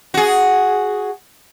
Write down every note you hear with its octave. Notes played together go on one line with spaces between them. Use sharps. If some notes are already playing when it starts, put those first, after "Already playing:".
F#4 G#4